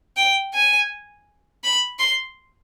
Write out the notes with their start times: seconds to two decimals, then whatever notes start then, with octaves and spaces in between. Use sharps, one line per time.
0.17 G5
0.54 G#5
1.64 B5
1.99 C6